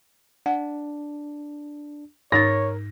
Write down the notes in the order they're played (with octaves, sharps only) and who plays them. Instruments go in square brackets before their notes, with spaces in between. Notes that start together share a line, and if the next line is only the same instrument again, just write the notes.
[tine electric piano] D4 [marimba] F#5
[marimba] G#2 D#4 A6 [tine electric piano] A#4 [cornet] C#5 [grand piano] A#6